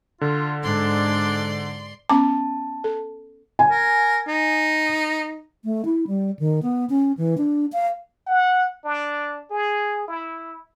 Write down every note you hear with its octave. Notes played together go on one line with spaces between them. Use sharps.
D3 F4
G#2 D4 D5 C6
B3 C#4 A5 D6
A4
G#5
A#4
D#4
A3
E4
G3
D#3
B3
C#4
E3
D4
F5
F#5
D4
G#4
E4